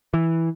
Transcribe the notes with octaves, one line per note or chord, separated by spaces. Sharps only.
E3